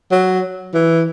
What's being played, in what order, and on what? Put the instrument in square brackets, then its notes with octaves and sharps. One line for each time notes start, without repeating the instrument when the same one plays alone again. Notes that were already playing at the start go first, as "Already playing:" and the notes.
[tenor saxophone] F#3
E3